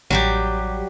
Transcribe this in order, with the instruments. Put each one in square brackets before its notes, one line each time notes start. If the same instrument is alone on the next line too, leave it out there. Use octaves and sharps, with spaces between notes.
[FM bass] A1 [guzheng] F#3 G3 G4